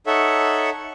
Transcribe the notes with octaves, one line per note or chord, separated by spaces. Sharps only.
D#4 A4 C#5 E5 F#5